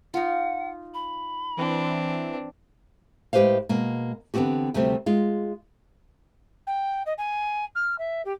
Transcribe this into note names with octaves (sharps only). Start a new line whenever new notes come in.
D#4 F4 F#5
B5
E3 C4 D4
A2 G#3 G4 B4 C5 F5
B2 G#3 A#3
D3 E3 B3 C4 F#4 G4
D2 C3 G3 A3 C4
G#3 F4
G5
D#5
G#5
F6
E5
G4